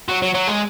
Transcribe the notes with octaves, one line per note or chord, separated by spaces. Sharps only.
F#3
F#3
F#3
G#3